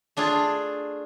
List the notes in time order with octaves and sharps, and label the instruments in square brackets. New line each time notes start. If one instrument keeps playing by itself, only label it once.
[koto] A3 D4 F4 G#4